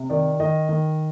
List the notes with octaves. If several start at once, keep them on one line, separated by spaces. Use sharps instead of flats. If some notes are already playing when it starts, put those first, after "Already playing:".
Already playing: C3
D#3 D5
D#3 D#5
D#3